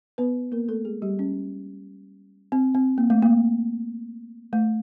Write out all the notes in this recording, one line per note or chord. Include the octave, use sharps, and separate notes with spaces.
B3 B4
A#3 A#4
A3 A4
G#3 G#4
G3 G4
C#4
C4
C4
A#3
A3
A#3
A3